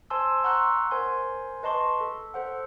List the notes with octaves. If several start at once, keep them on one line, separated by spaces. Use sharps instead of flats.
C5 G#5 A5 C6 E6
F#5 A#5 C6 C#6 E6 F#6
A#4 C5 G#5 C6
B4 D#5 A5 C6 C#6
A4
A4 C5 F#5